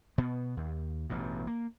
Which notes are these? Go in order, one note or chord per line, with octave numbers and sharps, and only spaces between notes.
B2 B3
D#2
A1 G2 B2
A#3